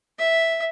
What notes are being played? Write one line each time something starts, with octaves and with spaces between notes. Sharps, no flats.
E5